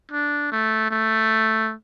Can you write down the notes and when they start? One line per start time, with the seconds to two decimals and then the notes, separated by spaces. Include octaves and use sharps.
0.12 D4
0.52 A3
0.91 A3